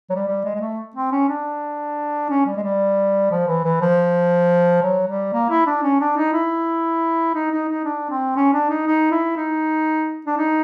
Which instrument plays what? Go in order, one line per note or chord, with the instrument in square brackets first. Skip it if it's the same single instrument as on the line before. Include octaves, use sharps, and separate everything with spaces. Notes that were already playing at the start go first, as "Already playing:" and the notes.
[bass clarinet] F#3
G3
G3
G#3
G#3
A3
C4
C#4
D4
C#4
G3
G#3
G3
F3
E3
E3
F3
F#3
G3
A#3
E4
D4
C#4
D4
D#4
E4
D#4
D#4
D#4
D4
C4
C#4
D4
D#4
D#4
E4
D#4
D4
D#4